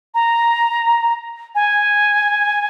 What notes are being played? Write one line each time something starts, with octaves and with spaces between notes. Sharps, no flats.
A#5
G#5